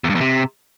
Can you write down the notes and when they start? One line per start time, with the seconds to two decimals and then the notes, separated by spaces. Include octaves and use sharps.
0.04 E2
0.10 G2
0.15 E2
0.21 C3